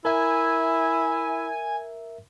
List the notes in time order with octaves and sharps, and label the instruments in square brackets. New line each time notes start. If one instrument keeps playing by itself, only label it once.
[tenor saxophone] E4 [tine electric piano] A#4 E5 [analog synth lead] G#5